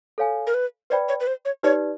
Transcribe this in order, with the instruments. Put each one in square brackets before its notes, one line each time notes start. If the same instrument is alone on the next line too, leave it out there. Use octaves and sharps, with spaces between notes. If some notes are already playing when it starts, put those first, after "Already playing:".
[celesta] A4 C#5 F5 G#5
[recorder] A#4
B4
[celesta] B4 D5 G5 B5 [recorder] C5
[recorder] C#5
B4
C5
C#5
[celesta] D#4 G4 B4 D5 [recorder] C#5